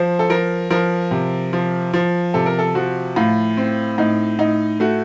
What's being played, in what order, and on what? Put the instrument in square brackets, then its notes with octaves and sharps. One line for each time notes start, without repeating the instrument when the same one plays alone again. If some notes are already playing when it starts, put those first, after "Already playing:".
Already playing: [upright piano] F3 C5
A4
F3 A#4
F3 A#4
C3
F3
F3
C3 A4
A#4
A4
F3 F#4
A2 F4
C4
A2 D#4
A2 D#4
A3 F#4